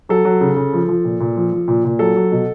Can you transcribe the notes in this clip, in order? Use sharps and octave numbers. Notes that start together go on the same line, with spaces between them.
F#3 A4
F#3
C#3
C#3
F3
F3
A#2
A#2
F3
F3
A#2
A#2
F#3 A4
F#3
B2